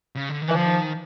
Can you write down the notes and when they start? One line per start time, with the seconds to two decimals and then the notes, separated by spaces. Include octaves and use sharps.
0.16 C#3
0.29 D3
0.42 D#3
0.49 E3
0.54 D3 F3
0.66 D#3